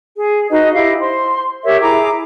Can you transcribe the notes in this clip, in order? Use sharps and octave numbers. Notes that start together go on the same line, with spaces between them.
G#4
D#4 F#4 B4 D#5
E4 G4 D#5 F5
C5 C6
G4 A#4 C#5 E5
E4 G#4 A#5 D6